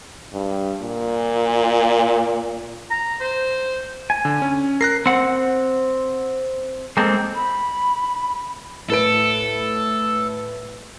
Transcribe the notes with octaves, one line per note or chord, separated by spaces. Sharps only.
G2
A#2
A#5
C5
G#5
D3
C#4
A#4 F#6 A#6 C7
C4 F#5
G#3 A#3 C4 A4
B5
A2 A4 B4 D7